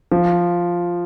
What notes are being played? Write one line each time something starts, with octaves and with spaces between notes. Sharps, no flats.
F3